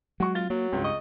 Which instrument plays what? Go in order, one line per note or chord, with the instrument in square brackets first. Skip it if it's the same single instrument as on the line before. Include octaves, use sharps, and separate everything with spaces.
[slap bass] F#3 G#3 [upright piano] F#4 C#6
[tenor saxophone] F4 [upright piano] A6 G7
[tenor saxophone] F#3 [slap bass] A#3 [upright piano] F#4
[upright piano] C#2 [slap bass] G2
[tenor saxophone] D#5 [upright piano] C#6